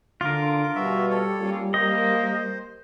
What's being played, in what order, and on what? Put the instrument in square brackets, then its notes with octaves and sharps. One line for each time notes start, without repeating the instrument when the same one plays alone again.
[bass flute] D3 [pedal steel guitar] F4 A#4 [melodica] D6
[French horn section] B2 [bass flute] G3 [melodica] F#4 E5
[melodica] A4 C#5
[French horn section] A#3 C#4 F4
[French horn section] A#3 [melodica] C5 [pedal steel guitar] D#5